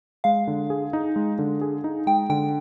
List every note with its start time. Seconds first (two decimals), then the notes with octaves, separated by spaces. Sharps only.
0.24 G#3 F5
0.47 D3
0.70 G#4
0.93 D#4
1.16 G#3
1.39 D3
1.61 G#4
1.84 D#4
2.07 G#3 G5
2.29 D3 G5